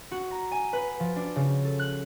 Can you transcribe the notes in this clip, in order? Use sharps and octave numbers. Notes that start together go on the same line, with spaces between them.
F#4
A#5
G#5
B4
F3
D4
C#3
A4
F#6